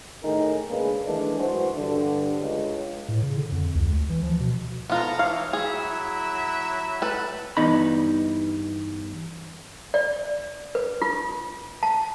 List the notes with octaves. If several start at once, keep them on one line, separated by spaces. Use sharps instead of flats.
A2 D#3 D#4 G#4 A#4
C#3 G#3 A#3 D4 G#4 B4
D#3 E3 G#3 A3 D4
F#2 E3 F#3 F#4 C5
G2 D3
C#2
A2
C#3
D3
F2
C#2
D2
E3
F3
B2
G#2 B3 F4 A4 A#5
E3 D#4 C#5 F5
F#3 E4 G#4 E5
A4 B4
G2 E3 G3 B3 D#4 B5
D5
B4
F4
A5